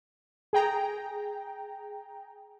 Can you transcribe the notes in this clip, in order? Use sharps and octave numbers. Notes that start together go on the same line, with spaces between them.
G#4 G5 A#5